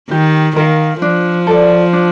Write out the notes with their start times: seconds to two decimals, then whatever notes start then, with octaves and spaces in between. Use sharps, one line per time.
0.11 D#3 G4
0.56 D#3 A#4 F5
1.02 F3 D4
1.47 A4 D5
1.93 D4